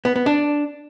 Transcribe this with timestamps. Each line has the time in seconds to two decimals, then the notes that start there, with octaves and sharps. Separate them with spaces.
0.05 B3
0.16 B3
0.26 D4